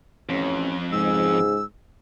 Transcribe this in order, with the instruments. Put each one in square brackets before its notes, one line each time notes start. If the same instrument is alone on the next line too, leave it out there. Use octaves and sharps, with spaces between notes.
[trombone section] A1 C#4 [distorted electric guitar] F2
[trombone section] C#2 G#4 [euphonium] G#2 [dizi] E6